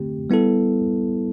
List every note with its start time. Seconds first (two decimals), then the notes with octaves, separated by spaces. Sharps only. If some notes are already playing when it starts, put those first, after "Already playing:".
Already playing: D3 A3 C4 G4
0.30 G3 B3 E4 A4